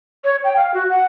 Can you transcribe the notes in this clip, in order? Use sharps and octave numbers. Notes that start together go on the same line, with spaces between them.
C#5
G5
F5
F#4
F#5